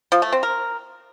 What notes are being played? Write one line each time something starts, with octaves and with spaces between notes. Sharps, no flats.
F3
A3
C4
A#4